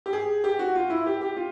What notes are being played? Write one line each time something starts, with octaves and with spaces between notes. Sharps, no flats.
G4
G#4
G4
F#4
F4
E4
G4
G4
F4